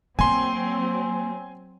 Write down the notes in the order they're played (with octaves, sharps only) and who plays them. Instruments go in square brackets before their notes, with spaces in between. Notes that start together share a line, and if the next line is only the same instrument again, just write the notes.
[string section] F#3 C4 [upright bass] A#3 [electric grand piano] G#5 C6